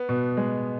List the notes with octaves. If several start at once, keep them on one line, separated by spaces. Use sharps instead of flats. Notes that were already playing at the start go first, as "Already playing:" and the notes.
Already playing: B3
B2
G#3